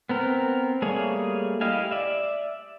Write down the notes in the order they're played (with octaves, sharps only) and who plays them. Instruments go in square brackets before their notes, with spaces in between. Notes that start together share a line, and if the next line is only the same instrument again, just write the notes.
[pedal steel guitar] B3 C4 A#4
G3 A3 A#3 G#4 C#5
E4 G4 D#5 F5 G#5
D5 E5